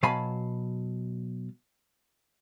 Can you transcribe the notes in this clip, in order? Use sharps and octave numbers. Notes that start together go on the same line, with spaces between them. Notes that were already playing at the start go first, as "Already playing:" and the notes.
B2 F#3 F5 G#5 A5 B5